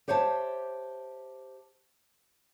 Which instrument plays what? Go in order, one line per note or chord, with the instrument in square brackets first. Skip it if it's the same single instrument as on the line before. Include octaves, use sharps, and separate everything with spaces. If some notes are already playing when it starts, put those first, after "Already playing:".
[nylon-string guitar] G4 C5 C#5 E5 A5